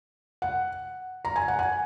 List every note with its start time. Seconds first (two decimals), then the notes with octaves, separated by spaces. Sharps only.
0.42 F#5
1.25 A#5
1.36 G#5
1.48 F#5
1.59 G#5